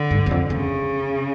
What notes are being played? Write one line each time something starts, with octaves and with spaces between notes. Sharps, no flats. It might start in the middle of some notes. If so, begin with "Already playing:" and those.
Already playing: D3
G2
E2
F2
E2 C#3